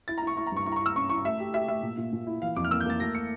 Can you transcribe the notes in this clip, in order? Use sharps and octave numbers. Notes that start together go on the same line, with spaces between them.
E4 A6
A#5
E4 C#6
E4 C#6
A#5
G2 C#6
E4 C#6
A#5
C#6
E4 E6
C#4 C#6
E4 C#6
A3 E5
G4
G4 E5
A3 E5
A#2
A#2
A#2
E4
E3 F5
F2 D6
F6
A#3 E6
G6
A#3 A6
A3 A#6
C#7